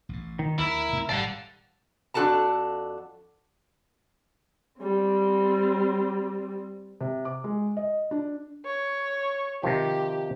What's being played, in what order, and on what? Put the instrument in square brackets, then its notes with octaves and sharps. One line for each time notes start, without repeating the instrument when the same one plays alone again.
[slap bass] A1 A2
[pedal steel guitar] D#3
[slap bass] D2 [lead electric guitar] E4 [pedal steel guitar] A#4
[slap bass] C3 A3 C4
[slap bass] G#1 A#2 D#3 [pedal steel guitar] G3 F5 A5 [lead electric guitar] D5 F#5
[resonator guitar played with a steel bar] F2 D4 F#4 A4 A5 A#5
[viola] G3 C4
[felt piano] C3
D6
G#3
D#5
D4
[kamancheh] C#5
[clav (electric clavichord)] C3 D#3 F3 [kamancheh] G4